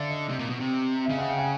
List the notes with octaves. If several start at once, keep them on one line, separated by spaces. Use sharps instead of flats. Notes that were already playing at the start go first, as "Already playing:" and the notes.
Already playing: D3 D5 E5 F5
D#5
C3
A#2
B2
C3
E5
C#3 D#5 F5
E5 F#5
F5 G5
F#5 G#5